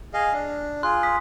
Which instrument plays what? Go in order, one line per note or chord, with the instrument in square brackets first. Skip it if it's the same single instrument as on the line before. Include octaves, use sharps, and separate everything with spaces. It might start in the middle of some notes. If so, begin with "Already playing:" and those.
[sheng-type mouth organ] G#4 D#5 F5
D4
[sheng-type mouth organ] F4 G#4 [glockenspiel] C6 F#6
[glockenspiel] D#6 B6